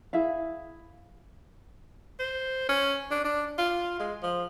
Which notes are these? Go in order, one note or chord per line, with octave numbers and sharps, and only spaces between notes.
E4 G#4 E5 F5
C5
C#4
D4
D4
F4
G#3
F3